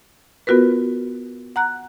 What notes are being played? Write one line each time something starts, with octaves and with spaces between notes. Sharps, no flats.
B3 F4 F#4 A#4 B4
F#5 A#5 F#6